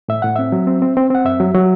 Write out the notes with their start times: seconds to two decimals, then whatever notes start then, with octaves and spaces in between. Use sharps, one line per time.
0.09 A2 E5
0.22 A2 F#5
0.36 C4 E5
0.52 F#3
0.67 C4
0.82 C4
0.97 C4
1.10 C4 F#5
1.25 F#2 E5
1.40 F#3
1.54 F#3